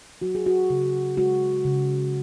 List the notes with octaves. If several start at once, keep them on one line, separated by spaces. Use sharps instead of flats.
F#3 F#4
G#4
F#4
C#3
G#3 F#4
C#3